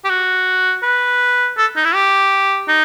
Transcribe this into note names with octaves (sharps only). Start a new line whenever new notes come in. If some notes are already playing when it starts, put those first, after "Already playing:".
G4
F#4
B4
A4
D#4
E4
G4
D#4